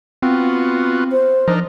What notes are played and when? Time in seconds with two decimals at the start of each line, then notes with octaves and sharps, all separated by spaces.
0.22 B3 C4 F4 F#4
1.12 C5
1.48 F3 D4 D#4 A#4